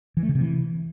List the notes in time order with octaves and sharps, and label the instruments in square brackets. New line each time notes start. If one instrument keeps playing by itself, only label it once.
[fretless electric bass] E3
A3
C#3
C3
E3